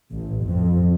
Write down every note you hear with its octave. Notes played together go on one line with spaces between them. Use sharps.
A1
F2